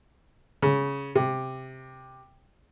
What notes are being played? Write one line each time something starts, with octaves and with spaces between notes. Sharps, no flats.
C#3
C3